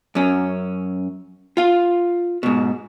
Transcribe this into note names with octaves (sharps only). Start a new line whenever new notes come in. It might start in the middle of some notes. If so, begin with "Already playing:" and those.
F#2 C#4
F4 F5
G#2 B2